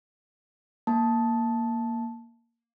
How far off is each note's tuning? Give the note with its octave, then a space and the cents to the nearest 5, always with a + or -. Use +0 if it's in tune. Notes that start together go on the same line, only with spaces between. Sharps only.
A#3 +0 A5 -5